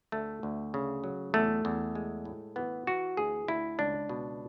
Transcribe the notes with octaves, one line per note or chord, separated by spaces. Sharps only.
D2 A3
D2
C#3
F#3
E2 A3
E2
G#3
A2
E3 B3
E3 F#4
D2 G#4
D2 E4
C#2 D4
B2